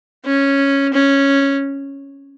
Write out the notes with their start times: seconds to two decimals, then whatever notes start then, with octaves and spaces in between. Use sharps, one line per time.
0.26 C#4
0.93 C#4